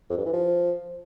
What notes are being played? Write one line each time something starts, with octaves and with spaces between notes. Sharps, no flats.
F2
G2
E3
F3